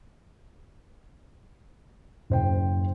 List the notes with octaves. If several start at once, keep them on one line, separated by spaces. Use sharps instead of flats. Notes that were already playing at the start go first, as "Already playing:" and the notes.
F#1 C5 G5